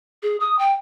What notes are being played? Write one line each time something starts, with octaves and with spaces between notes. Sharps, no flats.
G#4
D#6
G5